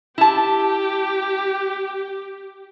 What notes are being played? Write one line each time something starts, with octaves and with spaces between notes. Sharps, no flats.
E4 G4 A5